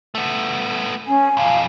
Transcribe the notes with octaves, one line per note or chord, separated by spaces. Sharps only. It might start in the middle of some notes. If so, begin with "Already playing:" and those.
A3 B3
C#4 G#5
B1 F2 F5